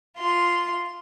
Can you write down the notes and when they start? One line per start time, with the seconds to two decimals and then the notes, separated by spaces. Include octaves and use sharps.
0.18 F4 C6